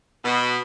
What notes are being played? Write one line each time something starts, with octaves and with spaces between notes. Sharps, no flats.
B2